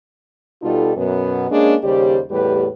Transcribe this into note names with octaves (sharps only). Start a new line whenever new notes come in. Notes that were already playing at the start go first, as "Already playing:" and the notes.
B2 G3 D#4 F4 A4
F#2 B2 B3
G#3 A#3 C#4 D4 G#4
D#2 C#3 G3 G4 C5 D5
E2 A2 G3 G4 B4